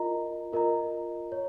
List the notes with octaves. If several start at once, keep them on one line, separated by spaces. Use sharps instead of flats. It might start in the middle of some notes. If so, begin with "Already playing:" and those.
Already playing: F4 A#4 D#5 A#5
F4 A#4 D#5 A#5
C#5